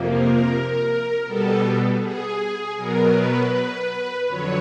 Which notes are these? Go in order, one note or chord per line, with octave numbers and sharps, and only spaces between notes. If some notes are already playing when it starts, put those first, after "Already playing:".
Already playing: F2 C3 F3 A#3
A#4
B2 G3 B3 A4
G#4
B2 F#3 B3 A#4
B4
F2 D3 F#3 C#5